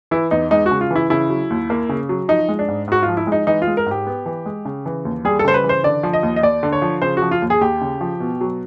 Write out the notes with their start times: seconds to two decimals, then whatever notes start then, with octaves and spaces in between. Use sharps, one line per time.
0.11 E3 E4
0.31 E2 D#4
0.51 G#3 D#4
0.66 F#4
0.71 C#3
0.81 F4
0.91 E3 E4
1.10 C#3 E4
1.30 F#3
1.50 D#2
1.70 A#3
1.89 C#3
2.09 F#3
2.28 F3 D#4
2.49 G#3
2.59 D4
2.68 G#2
2.88 G#2 F#4
3.03 F4
3.08 F3
3.17 E4
3.27 G#3
3.32 D#4
3.47 E3 D#4
3.62 F4
3.67 G#3
3.77 A#4
3.86 G#2 G4
4.07 B3
4.26 E3
4.46 G#3
4.65 C#3
4.86 E3
5.05 D#2
5.25 G3 G#4
5.39 A4
5.44 C#3 C5
5.54 B4
5.64 E3
5.69 C5
5.84 D3 D5
6.03 F3
6.13 D#5
6.23 D#2
6.36 D#5
6.43 D#2 D5
6.63 D3
6.73 C#5
6.82 F3
7.02 C#3 C5
7.17 F#4
7.22 F3
7.31 F4
7.42 D#2
7.50 G#4
7.61 D#2 G4
7.81 C#3
8.01 F3
8.20 B2
8.41 F#3